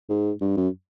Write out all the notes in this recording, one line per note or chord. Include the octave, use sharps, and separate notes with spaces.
G#2
G2
F#2